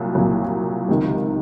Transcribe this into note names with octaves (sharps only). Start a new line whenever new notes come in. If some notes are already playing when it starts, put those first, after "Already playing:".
Already playing: C2 A#2 F#3
C2 A#2 F#3
C#2 C3 D#3